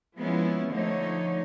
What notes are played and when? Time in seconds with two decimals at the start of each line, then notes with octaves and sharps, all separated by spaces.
0.18 F3 G#3 B3 C#4 E4
0.70 D3 F3 A3 D#4 C#5